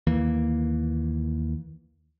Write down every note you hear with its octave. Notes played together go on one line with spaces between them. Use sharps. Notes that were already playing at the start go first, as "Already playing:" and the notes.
D#2 E3 A#3